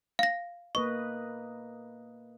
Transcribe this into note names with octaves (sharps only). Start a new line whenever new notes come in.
F5 A#6
A#3 B4 D#5 C#6